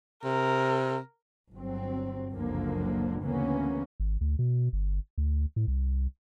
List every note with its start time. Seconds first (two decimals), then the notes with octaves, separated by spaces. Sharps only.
0.24 C3 A#4
1.52 G1 F#3 C4
2.32 F#1 C#2 F#2 D3 F3 A#3
3.21 D2 C#3 E3 A#3 B3 C#4
4.00 G#1
4.21 D2
4.39 B2
4.73 G1
5.18 D2
5.56 A2
5.68 C2